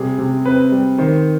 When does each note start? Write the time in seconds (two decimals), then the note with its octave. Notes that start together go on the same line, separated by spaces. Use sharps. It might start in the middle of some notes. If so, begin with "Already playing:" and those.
Already playing: C3 G3 G#4
0.19 C3
0.45 C4 B4
0.72 G3
0.98 D#3 C5